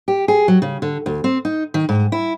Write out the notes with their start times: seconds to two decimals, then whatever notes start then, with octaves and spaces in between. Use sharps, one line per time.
0.08 G4
0.28 G#4
0.48 F#3
0.62 C#3
0.82 D3
1.06 D2
1.24 C4
1.45 D#4
1.74 D#3
1.89 G#2
2.12 E4